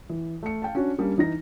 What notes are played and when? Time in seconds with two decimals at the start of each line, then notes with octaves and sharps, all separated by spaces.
0.09 E3
0.43 A3 C#7
0.62 F5 G5 A5
0.75 C#4 D4 F#4 C#5
0.98 G3 A#3 C#4 D4
1.18 E3 D#4 A#6